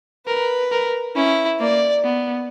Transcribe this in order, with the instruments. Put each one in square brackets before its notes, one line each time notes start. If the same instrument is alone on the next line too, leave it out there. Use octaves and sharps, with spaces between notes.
[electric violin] A#4 [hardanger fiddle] B4
[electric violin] A#4
[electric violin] C#4 [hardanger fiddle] E4
[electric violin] A#3 [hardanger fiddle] D5
[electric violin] B3